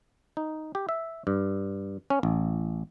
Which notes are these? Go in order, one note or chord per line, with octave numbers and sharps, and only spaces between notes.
D#4
G4
E5
G2
C#4
A1